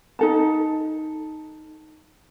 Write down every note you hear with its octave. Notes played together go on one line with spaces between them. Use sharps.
D#4 A4 A5